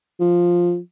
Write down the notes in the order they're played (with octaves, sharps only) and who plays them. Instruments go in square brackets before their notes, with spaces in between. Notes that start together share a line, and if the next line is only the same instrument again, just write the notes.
[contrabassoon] F3